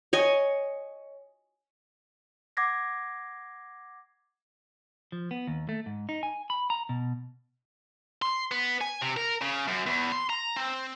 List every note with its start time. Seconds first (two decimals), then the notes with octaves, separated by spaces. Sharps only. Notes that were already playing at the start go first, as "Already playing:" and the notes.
0.13 C#5 D#5 G#5
2.57 F#5 D6 G#6 A#6 C7
5.12 F3
5.31 B3
5.47 D#2
5.69 A3
5.86 G#2
6.09 D#4
6.23 G#5
6.50 B5
6.70 A#5
6.89 B2
8.22 C6
8.51 B3
8.81 G#5
9.02 C3
9.17 A#4
9.42 C#3
9.68 F#2
9.87 E2
10.12 C6
10.29 A#5
10.56 C4